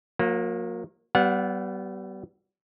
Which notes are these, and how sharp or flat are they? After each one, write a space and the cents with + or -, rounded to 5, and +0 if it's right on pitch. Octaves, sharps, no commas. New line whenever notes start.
F#3 -40 A#3 +0
G3 -35 B3 +0 F#5 -35